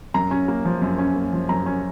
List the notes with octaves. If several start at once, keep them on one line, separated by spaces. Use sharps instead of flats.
F#2 A#5
C#4
A#3
F3
F#2
C#4
A#3
F3
F#2 A#5
C#4